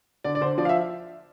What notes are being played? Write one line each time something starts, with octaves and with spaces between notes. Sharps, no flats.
D3 D5
D5
D3 C5
F3 D5
F5
E5